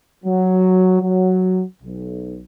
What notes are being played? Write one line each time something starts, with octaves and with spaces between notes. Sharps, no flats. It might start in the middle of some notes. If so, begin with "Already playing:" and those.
F#3
F#3
B1